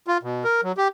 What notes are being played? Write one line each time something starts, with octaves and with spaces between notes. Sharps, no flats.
F4
B2
A#4
F#3
G4